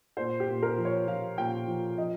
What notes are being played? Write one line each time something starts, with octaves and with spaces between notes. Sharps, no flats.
A#2 C5
G4
A#2
A#4
F3
C#5
F3 F5
A#2 G5
F3
F3 D#5